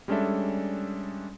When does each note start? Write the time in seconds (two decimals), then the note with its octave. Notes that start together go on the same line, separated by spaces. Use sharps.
0.08 G3 G#3 C#4 D4 A4 E5